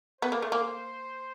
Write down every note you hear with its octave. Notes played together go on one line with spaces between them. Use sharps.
B3 C5
A#3
A3
A#3